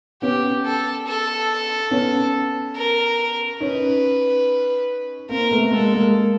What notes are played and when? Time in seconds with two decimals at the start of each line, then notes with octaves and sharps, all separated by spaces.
0.22 B3 C#4 G4
0.65 A4
1.07 A4
1.91 B3 C#4
2.76 A#4
3.60 C#4 D#4 B4
5.29 A#3 C4 A#4
5.51 A3 B3
5.71 G#3 A#3 A4
5.93 G#3 A#3